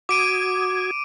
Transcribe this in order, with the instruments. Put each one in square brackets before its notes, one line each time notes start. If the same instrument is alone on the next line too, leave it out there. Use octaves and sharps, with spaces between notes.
[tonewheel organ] F#4 D#6 G#6 [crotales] D6 D7 D#7